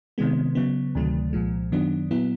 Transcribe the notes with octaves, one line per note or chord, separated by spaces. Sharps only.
C3 D#3 G#3 B3
C#3 F#3 B3
D2 C3 D#3 F#3 A3
C2 A#2 F3 G#3
F#2 D#3 F#3 B3 D4
A#2 F#3 B3 E4